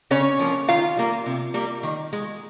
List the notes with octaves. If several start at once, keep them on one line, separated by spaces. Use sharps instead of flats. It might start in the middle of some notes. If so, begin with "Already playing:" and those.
C#3 C#4 C#5
F3 A#3
D#3 F4 F5
G3 A#3
C3
G3 A#3
D#3
G#3